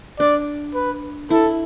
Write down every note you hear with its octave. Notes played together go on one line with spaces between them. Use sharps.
D4 D5
B4
E4 A4